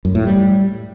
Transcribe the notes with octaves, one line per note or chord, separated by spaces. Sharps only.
F#2
A2
G3